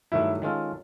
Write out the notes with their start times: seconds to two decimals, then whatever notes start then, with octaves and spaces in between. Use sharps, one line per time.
0.12 G2 D#3 F#3 A3 E4
0.42 D#3 G#3 C#4 F4 A4